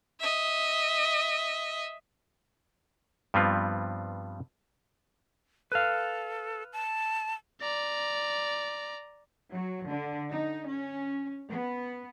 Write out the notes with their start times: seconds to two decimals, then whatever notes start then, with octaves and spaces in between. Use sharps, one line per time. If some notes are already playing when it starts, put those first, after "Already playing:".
0.20 D#5 E5
3.34 G2 F3 G3 B3 C4 F4
5.72 A4 B4 F5
6.73 A5
7.61 D5 A#5
9.53 F#3
9.88 D3
10.30 D#4
10.69 C#4
11.49 B3